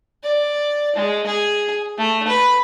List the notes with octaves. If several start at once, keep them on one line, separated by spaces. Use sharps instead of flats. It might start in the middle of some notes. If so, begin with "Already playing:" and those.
D5
G#3
G#4
A3
B4